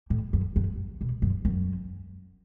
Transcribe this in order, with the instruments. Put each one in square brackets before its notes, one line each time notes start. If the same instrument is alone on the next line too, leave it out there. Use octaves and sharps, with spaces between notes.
[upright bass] A2
F#2
F#2
B2
F#2
F#2